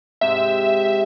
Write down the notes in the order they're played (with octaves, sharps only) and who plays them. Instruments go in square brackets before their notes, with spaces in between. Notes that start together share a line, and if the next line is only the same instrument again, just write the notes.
[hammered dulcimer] G#2 C3 [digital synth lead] E5